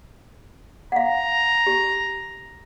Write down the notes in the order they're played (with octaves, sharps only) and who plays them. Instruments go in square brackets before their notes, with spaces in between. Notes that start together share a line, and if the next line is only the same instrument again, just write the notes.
[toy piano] F5 F#5 [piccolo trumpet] A#5
[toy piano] G4